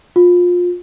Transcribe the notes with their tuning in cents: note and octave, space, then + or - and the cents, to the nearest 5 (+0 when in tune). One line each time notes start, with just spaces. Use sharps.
F4 +25